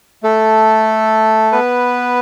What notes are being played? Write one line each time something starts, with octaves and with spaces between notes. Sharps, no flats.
A3 A4
B3 B4